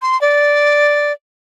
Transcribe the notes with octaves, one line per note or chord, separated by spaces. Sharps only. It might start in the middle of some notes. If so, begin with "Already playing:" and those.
C6
D5